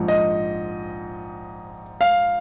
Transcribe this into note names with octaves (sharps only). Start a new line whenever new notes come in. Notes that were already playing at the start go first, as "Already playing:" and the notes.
Already playing: A#1 G#2 F3
D#5
F5